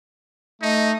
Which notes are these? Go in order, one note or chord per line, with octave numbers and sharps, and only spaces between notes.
A3 D#4 D#5